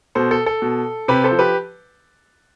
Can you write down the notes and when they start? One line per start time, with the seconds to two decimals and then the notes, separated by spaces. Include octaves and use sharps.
0.15 B2 A4 C5
0.31 A4
0.46 A4
0.62 B2
1.08 C3 G4 B4
1.24 A4 C5
1.31 F3
1.39 G4 B4